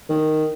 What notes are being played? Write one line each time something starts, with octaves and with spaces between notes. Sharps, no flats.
D#3